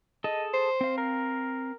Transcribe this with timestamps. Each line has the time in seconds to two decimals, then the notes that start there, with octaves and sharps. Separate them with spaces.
0.24 G#4 A4 D#5 A5
0.53 C5
0.81 C4 F5
0.97 A#4